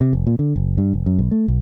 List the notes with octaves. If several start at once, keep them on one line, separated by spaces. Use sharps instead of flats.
C3
F1
A#2
D3
F#1
G2
F1
F#2
B1
A3
B1